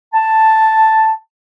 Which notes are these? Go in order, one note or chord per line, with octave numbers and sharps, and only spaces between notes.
A5